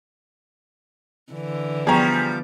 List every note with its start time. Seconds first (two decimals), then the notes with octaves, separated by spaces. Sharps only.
1.33 D3 E3
1.87 F3 G3 B3 G#4 G5 A#5 C#6